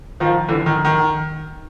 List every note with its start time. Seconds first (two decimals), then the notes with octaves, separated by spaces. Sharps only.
0.20 D#3 F3
0.48 D3 E3
0.66 D#3
0.85 D#3